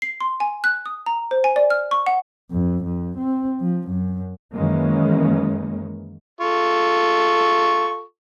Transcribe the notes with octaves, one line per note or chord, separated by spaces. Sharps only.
C7
C6
G#5
F#6
D#6
A#5
C5
G#5
D5
F6
C#6
F#5
F2
F2
C4
F3
F#2
F#2 D#3 E3 G#3 A#3 C#4
F4 A4 C#6